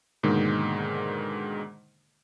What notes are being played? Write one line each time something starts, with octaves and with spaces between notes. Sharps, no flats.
G#2 B2 D3 D#3 G#3 A#3